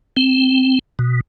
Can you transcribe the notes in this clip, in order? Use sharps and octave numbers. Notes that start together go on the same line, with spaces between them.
C4
B2